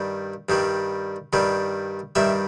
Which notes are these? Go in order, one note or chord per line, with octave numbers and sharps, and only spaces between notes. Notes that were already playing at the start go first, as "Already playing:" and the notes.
Already playing: G2 D#3 G3
G2 D#3 G3
G2 D#3 G3
G2 D#3 G3 E5